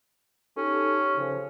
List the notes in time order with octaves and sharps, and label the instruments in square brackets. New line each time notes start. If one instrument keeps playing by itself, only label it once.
[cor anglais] C#4 [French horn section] D#4 G4 A4
[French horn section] C#3 F3